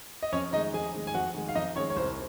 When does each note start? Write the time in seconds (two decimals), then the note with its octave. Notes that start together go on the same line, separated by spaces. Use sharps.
0.23 D#5
0.32 F2 C#4 C#5
0.53 D#3 G#3 D#4 D#5
0.73 F2 G#4 G#5
0.94 D#3 G#3
1.07 G#5
1.14 F2 F#4 F#5
1.34 D#3 G#3
1.49 F5
1.55 F2 D#4 D#5
1.76 D#3 C#4 C#5
1.80 G#3
1.90 C#5
1.96 C2 C5